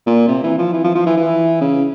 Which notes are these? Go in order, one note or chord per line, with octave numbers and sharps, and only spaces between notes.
A#2
C3
E3
F3
E3
F3
F3
E3
E3
C#3